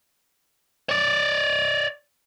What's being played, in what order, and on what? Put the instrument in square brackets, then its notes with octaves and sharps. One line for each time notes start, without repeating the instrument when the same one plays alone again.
[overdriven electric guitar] C#5 D5